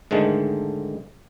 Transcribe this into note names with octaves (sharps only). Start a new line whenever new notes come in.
G#2 D3 D#3 G#3 A3